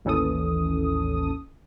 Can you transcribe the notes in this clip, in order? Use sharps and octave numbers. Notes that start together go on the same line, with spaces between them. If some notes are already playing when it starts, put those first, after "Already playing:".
A1 D#2 E3 C#4 A4 D#6